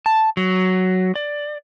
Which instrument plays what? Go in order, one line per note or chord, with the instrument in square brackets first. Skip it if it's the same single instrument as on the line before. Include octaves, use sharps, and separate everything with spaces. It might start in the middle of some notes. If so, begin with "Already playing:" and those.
[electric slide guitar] A5
F#3
D5